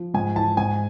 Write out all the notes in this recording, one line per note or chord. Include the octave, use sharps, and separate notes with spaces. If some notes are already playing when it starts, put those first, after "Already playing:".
Already playing: F3
G#2 G#5
E3 A5
G#2 G#5